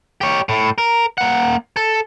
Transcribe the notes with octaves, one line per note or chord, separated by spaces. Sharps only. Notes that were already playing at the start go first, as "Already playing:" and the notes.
G4 C#5
A2
A#4
A#3 F#5
A4